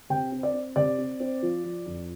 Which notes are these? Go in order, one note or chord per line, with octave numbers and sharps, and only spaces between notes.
C3 G5
C4
D5
C4
C3 D5
C4
C4
F3
F3
F2